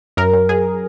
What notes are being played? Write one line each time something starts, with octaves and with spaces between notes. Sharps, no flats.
F#2 A#4
F#2
F#2 G#4